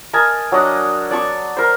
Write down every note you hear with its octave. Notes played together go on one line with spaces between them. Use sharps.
A#4 D#5 G#5 A5
F#3 D4 D#5 F#5
D5 A5 C#6 D6
A#4 C5